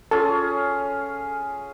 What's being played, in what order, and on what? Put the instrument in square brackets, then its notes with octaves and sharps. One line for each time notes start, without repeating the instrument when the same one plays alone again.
[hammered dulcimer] C#4 F4 G#4 [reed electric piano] A4